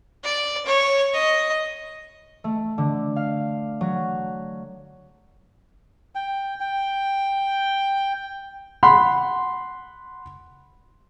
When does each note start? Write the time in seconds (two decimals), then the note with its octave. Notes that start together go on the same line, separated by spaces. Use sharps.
0.24 D5
0.66 C#5
1.14 D#5
2.44 A3
2.78 D3
3.16 F5
3.81 F#3
6.15 G5
6.60 G5
8.83 F#5 B5 C6